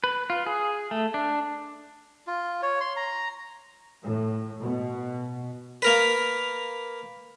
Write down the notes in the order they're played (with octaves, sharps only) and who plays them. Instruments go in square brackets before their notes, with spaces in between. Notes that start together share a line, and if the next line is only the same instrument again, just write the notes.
[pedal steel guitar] B4
F4
G#4
A3
D4
[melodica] F4
C#5
C6
A#5
[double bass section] A2
B2
[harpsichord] A#3 A#4 B4